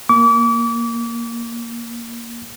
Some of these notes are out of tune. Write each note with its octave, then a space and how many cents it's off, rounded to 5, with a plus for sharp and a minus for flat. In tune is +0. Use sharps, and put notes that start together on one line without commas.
A#3 +5 D6 -35